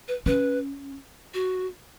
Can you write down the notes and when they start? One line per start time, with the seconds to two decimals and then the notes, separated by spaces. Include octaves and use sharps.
0.08 B4
0.26 C#4 B4
1.34 F#4